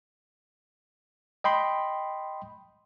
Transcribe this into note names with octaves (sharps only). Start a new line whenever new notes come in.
D#5 G5 B5 C6